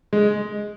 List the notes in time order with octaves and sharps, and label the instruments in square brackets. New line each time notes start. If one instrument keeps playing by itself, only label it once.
[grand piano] G#3